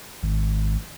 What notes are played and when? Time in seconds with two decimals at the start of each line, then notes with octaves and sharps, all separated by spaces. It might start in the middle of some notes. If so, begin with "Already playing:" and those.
0.23 G#1